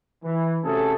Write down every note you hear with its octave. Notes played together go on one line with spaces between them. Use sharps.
E3
C3 A3 C#4 F#4 G#4 A4